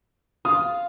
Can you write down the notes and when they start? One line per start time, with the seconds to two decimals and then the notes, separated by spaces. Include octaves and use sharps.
0.45 F4 D#6